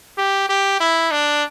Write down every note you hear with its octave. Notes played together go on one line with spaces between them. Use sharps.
G4
G4
E4
D4